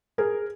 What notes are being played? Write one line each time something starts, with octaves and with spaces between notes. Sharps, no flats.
G#4 A#4